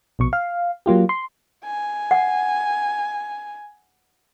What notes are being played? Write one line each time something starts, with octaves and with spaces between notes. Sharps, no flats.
A#1 B2 C#6
F5
F#3 A#3 F4 G4
C6
G#5
F#5